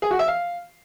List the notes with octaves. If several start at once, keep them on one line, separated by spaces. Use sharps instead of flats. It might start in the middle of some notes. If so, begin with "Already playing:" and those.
G#4
F#4
E5
F5